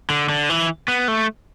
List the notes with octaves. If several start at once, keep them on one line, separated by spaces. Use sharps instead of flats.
D3
D3
E3
B3
A3